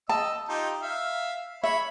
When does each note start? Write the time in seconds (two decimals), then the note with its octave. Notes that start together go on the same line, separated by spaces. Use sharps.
0.09 D#5 A5 E6
0.49 D#4 F4 G4
0.82 E5 F5
1.64 C#5 E5 B5